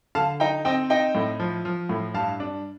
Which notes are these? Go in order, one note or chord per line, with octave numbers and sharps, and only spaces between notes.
D3 F5 A5
D#4 G5 A#5
C4 D#5 G5
D#4 D#5 G5
A2
F3
F3
A2
G2 F5 A5
D4